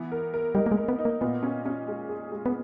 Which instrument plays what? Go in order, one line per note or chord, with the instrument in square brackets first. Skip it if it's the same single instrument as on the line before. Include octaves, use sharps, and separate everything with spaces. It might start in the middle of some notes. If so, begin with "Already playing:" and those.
Already playing: [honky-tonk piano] E3 B3
A#4
A#4
[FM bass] G3 [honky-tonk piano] D#4
[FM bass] A#3
G#3
[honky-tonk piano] A#4
[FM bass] B3
[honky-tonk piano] D#4
[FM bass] A#3
[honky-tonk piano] A#2 [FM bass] B3
[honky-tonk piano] C#4
C#4
G#3
G#4
G#3
[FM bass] B3